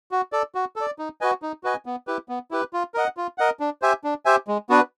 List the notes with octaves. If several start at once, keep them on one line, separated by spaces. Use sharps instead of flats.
F#4
A4 D5
F#4
A4 D5
D#4
F#4 B4 D#5 G#5
D#4
F#4 B4 D#5 G#5
B3
E4 G4 B4
B3
E4 G4 B4
F4
A#4 D#5 F#5
F4
A#4 D#5 F#5
D4
G4 C5 E5 G#5
D4
G4 C5 E5 G#5
G#3
B3 D4 F#4 B4